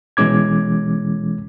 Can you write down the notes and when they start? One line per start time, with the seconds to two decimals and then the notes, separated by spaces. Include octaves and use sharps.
0.17 B2 E3 G#3 C#4 D6 G#6